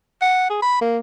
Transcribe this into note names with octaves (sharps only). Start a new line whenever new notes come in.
F#5
G#4
B5
A#3